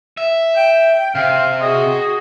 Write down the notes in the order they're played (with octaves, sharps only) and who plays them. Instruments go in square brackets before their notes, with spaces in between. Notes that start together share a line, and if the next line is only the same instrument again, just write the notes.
[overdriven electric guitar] E5
[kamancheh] G5
[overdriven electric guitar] C3 [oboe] F5
[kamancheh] F#4 G#4 [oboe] D#5